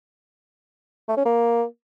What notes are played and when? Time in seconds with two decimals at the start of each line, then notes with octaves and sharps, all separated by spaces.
1.09 A3
1.17 C#4
1.25 A#3